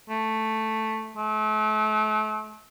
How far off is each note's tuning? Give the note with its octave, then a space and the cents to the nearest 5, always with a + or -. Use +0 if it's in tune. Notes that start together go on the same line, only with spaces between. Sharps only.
A3 +0
A3 -40